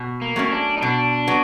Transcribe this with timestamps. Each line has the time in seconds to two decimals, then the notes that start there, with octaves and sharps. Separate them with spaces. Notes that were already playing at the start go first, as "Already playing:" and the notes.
Already playing: B2
0.21 A#3
0.36 F#3 A3 C#4
0.51 D4
0.78 D#4
0.81 B2 D4
1.27 F#3 B3